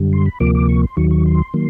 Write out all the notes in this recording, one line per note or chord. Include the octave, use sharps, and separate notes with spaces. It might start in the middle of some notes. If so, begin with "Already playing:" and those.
Already playing: F#2 D3 G3
C6
B5
D2 C3 F3 A#3 D6
D6
C#6
C6
D#2 D#3 F#3 C#6
C#6
C6
D#3 F#3 A#3